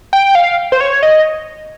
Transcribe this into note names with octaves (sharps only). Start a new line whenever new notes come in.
G5
F5
C5
C#5
D#5